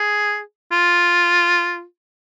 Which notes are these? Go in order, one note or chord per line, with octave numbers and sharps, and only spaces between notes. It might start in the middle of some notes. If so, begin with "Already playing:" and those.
Already playing: G#4
F4